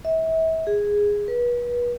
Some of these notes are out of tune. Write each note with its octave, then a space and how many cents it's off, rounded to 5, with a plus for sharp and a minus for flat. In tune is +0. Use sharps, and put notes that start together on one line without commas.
E5 -35
G#4 -10
B4 -35